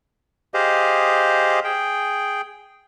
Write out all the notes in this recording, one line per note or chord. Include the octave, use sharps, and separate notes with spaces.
G4 G#4 C5 D#5 F5
G#4 G5